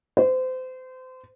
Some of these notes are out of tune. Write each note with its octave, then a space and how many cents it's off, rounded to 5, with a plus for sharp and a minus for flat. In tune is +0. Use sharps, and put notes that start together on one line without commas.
C5 -30